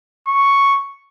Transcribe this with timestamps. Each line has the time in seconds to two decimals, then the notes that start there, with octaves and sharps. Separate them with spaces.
0.28 C#6